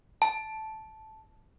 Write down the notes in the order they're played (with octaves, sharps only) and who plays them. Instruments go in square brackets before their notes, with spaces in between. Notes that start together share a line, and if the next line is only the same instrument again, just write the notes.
[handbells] A5